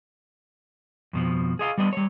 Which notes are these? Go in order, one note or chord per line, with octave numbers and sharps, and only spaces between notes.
F2 B2 F3
G#4 D#5 F5
G3 B3 D4 D#5
G3 C#5